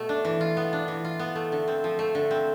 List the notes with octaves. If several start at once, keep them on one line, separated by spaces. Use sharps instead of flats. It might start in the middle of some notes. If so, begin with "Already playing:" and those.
Already playing: B2 A3
D4
E3
F4
B3
D4
E3
F4
B3
A3
D3
C4
F3
A3
D3
C4